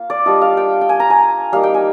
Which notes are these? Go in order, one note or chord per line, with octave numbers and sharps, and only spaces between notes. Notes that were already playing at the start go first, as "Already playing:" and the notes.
Already playing: A#3 F4 F5
D5
G3 D4 F4 D#5
F5
G5
G5
G#5
A#5
G#5
G3 A#3 D#4 F5
G5
G#5